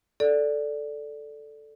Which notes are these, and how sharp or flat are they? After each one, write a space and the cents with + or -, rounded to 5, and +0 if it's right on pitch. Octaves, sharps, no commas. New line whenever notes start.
A4 +0 D5 +0